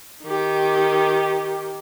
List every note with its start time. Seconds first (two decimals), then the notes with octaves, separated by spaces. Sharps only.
0.24 D#3 G4